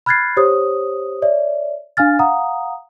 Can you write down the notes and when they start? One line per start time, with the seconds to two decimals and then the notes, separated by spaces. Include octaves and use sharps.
0.06 B5 F6 F#6 G#6 A6 C7
0.37 G4 C5 C#5 D#6
1.22 C#5 D5 E5
1.97 D4 F5 G#5 F6 A6
2.19 F5 F#5 A#5 D#6